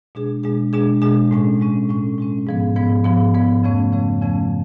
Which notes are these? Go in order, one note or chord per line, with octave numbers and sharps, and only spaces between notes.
B2 G#3 D4 G#4
B2 G#3 D4 G#4
B2 G#3 D4 G#4
B2 G#3 D4 G#4
A2 G#3 C#4
A2 G#3 C#4
A2 G#3 C#4
A2 G#3 C#4
G#2 F3 B3
G#2 F3 B3
G#2 F3 B3
G#2 F3 B3
F2 C#3 F3 A3 C#4
F2 C#3 F3 A3 C#4
F2 C#3 F3 A3 C#4